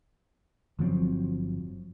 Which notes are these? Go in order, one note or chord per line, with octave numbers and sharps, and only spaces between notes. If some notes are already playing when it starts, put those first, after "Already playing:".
G1 F3 F#3 C4